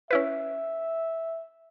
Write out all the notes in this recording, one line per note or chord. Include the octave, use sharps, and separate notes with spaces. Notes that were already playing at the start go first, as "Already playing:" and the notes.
C#4 E4 B4 E5